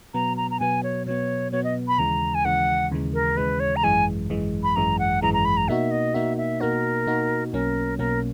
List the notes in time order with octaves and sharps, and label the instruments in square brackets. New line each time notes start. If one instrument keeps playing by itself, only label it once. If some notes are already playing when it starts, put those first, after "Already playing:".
[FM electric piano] B2 F#3 B3 [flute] A#5
[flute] A#5
A#5
[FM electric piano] B2 F#3 B3 [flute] G#5
[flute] C#5
[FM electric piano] B2 F#3 B3 [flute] C#5
[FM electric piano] B2 F#3 B3 [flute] C#5
[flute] D#5
B5
[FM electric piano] D#2 C#3 E3 G#3 [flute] A#5
[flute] G#5
[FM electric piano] D#2 C#3 E3 G#3 [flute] F#5
[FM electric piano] D#2 C#3 E3 G#3
[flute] A#4
[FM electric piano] D#2 C#3 E3 G#3 [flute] B4
[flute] C#5
A#5
[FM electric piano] G#1 F#2 E3 G#3 [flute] G#5
[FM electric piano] G#1 F#2 E3 G#3
[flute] B5
[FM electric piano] G#1 F#2 E3 G#3 [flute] A#5
[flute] F#5
[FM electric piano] G#1 F#2 E3 G#3 [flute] A#5
[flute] A#5
B5
A#5
[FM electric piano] B2 A#3 D#4 F#4 [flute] E5
[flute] D#5
[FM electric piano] B2 A#3 D#4 F#4 [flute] E5
[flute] E5
[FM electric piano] B2 A#3 D#4 F#4 [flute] A#4
[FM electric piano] B2 A#3 D#4 F#4
[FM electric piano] B1 B2 F#3 A#3 C#4 [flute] A#4
[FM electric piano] B1 B2 F#3 A#3 C#4 [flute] A#4